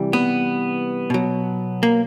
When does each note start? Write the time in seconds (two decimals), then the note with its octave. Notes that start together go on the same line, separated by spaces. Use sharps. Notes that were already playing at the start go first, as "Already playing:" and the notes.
Already playing: C3 E3 G3
0.13 B3
1.10 B2 F#3
1.83 A#3